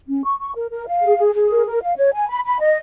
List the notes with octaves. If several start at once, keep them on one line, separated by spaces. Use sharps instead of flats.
C#4
C#6
C#6
A#4
A#4
F5
G#4
G#4
G#4
A#4
A#4
F5
C#5
G#5
B5
B5
D#5